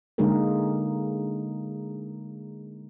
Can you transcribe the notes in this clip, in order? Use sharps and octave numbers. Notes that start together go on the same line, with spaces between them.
D3 G#3 A#3 D#4 G#4 A#4